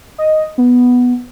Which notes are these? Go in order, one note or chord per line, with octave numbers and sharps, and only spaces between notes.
D#5
B3